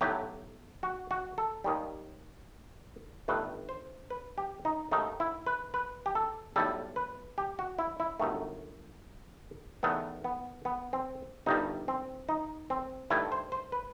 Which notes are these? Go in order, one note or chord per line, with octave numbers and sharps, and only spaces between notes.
B1 A2 F#3 A3 G4
F#4
F#4
A4
D#2 D#3 G3
G1 G2 D#3 A3 B4
C5
B4
G4
D#4
D#2 D#3 A3 D#4
E4
B4
B4
G4
A4
B1 A2 G3 A4
B4
G4
F#4
E4
E4
G1 F#2 D#3 A3
E2 D#3 A3 B3
B3
B3
C4
G1 G2 D#3 G3 D#4
C4
D#4
C4
G2 D#3 A3 E4
C5
C5
B4